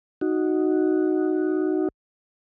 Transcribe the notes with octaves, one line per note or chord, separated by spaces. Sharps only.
D#4 F#4